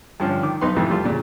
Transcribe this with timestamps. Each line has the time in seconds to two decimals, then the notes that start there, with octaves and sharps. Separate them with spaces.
0.20 G2 D3 F3 C#4 D4
0.43 D#3 D6
0.61 B1 B3 D#4 B4 C6
0.76 F2 G#2 C3 E3
0.90 G3 A3 F4
1.05 A#2 C#3